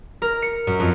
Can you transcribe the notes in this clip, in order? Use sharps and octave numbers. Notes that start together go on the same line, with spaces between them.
A#4
C#7
F#2
F2